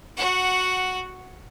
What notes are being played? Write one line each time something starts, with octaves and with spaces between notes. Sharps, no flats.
F#4 F#5